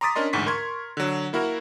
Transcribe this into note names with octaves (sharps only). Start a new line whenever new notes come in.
A#5 C6 D6 D#6 A6 B6
C#4 D4 A#4 D#5 C6
A1 D2 G#2 C#6 B6
A#4 C6 C#6 G#6
D3 F#3
A#3 E4 F#4 A#4